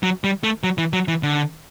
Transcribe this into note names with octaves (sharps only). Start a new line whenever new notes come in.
F#3
G3
A3
F#3
E3
F#3
E3
D3